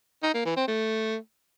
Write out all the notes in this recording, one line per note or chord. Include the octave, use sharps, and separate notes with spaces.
D#4
A#3
E3
C4
A3